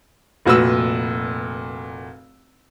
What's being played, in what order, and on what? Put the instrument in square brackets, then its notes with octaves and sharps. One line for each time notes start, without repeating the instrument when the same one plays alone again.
[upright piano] F1 A#2 F#4 B4 E6